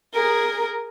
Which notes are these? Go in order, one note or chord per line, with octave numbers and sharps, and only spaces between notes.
G#4 A#4